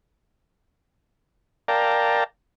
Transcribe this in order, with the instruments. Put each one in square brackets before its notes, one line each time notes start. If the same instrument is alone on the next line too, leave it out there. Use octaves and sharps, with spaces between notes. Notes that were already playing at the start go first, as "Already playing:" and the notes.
[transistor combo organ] A#4 D5 F5 G5 A5 A#5